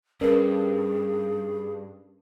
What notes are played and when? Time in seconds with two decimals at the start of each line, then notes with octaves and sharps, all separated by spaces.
0.21 G2 C#4 G#4 A#4 B4 D5